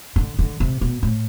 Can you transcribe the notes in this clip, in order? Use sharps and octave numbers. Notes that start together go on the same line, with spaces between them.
D3
D3
C3
B2
A2